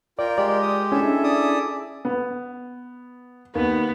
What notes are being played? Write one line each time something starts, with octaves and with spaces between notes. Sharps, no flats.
F4 A#4 D5 G5
G#3 G4 D5
D#6
C#4 D4 E4 G#4 A4 E5
D5 D#6
B3
D#2 B3